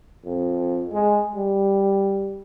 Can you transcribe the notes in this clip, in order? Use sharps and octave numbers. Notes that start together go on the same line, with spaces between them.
F2
G#3
G3